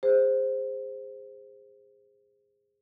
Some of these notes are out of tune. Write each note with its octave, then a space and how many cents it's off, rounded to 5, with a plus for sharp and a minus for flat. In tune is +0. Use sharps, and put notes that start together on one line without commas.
G#4 -25 C5 +0